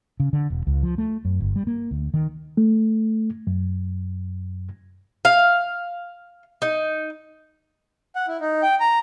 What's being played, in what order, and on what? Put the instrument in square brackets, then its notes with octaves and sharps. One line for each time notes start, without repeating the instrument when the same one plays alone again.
[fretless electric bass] C#3
D3
E1
C#2
F3
A3
F#2
G1
G3
A#3
D2
D#3
[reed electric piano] A3
F#2
[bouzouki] F5
D#4
[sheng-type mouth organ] F#5
E4
D#4
G5
A#5